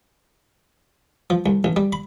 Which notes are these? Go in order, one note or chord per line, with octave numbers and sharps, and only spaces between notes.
F3
C2
A1
G3
B5